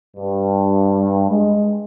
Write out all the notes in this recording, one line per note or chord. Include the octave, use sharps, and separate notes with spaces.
G2
G#3